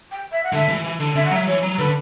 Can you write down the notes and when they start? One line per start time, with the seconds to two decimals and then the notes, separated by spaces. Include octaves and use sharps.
0.11 G5
0.32 E5
0.44 F#5
0.53 D3 E5
0.69 E3
0.84 E3
1.00 D3
1.15 D3 E5
1.25 F#5
1.31 F#3 E5
1.47 E3 C#5
1.62 F#3
1.78 D3 B4